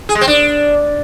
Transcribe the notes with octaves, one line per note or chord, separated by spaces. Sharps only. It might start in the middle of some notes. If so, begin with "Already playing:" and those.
G#4
G#3
C4
D4